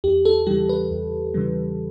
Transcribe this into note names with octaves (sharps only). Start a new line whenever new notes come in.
E2 G4
A4
C#3 E3 G3 G4
B4
E2
C#3 E3 G3